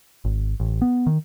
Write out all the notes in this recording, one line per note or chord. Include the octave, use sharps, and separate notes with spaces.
G#1
A1
B3
D#3